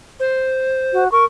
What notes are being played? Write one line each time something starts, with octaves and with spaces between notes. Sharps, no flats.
C5
F#4
A#4 C#6